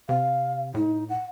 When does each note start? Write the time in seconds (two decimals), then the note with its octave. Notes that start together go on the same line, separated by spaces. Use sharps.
0.09 C3 F5
0.74 A2 D#4
1.09 F#5